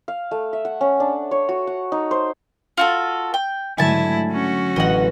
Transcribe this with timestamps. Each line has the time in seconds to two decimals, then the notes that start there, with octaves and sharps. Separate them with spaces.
0.08 F5
0.31 A3
0.53 E5
0.65 F#5
0.81 C#4
1.00 D4
1.31 C#5
1.49 F#4
1.67 F#5
1.92 D#4
2.11 C5
2.77 F4 F#4 A4
3.34 G5
3.78 G#2 D3 F#3 A3 E4 G#5 A5
4.32 C#4 F#4
4.76 A1 D#5 F#5 G5